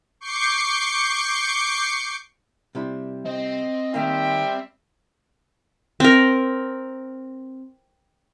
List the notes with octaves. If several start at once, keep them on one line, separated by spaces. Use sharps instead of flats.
C#6 D6 G6 C7 C#7
C3 G3 E4
C4 D#5
D#3 G3 A#3 D#4 E5 G5
C4 A#4